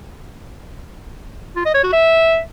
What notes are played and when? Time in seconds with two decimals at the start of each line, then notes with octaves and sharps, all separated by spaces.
1.56 F4
1.65 D#5
1.74 C#5
1.84 F#4
1.93 E5